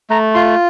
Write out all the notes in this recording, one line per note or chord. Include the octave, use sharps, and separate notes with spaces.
A3 A#5
F4 C6